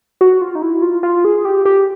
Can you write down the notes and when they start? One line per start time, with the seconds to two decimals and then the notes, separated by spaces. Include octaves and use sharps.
0.21 F#4
0.42 F4
0.55 D#4
0.62 E4
0.82 F4
1.03 F4
1.25 G#4
1.45 G4
1.65 G4